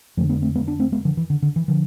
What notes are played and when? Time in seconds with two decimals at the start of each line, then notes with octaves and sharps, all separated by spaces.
0.17 F2 F3 A3
0.21 D3
0.29 G#3 B3
0.42 A3 C4
0.55 G#3 B3
0.67 B3 D4
0.79 A3 C4
0.92 G#3 B3
1.05 D3 F3
1.17 E3
1.30 D3
1.42 D3
1.56 E3
1.68 D3 F3